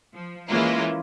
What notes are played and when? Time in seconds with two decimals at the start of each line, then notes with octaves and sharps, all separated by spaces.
0.14 F3
0.49 E3 G#3 A#3 C#4 E4 F4